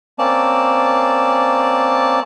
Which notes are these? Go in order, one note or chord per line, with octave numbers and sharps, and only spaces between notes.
A#3 C4 C#4 D5 A5